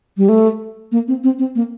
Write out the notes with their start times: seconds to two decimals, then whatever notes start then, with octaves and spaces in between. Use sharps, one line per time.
0.17 G3
0.29 A3
0.92 A#3
1.08 C4
1.24 C4
1.39 C4
1.55 A#3